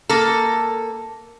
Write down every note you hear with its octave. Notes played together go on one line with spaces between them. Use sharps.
A#3 A4